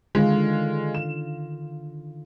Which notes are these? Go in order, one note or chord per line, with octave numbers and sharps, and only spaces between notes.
D3 D#3 G#3 F4
E7